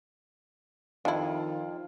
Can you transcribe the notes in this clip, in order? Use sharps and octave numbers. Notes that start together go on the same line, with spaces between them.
F2 D#3 D4 E4 F4